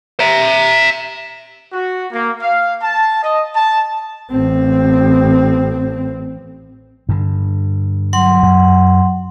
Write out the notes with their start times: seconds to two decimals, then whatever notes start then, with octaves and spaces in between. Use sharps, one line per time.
0.20 E5 A#5
1.73 F#4
2.13 A#3
2.42 F5
2.82 A5
3.23 D#5
3.54 A5
4.31 A1 C4
7.09 G2 D3
8.13 F#3 F#5 C6
8.43 F#2